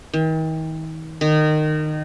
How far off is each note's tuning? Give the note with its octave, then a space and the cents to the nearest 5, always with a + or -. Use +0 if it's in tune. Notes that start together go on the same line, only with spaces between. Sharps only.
D#3 +40
D#3 -20